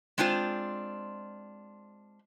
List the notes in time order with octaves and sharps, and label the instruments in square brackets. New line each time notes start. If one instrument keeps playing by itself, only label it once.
[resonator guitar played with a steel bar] G#3 C4 D4 F4 C5